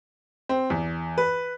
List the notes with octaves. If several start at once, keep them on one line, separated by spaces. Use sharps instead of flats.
C4
E2
B4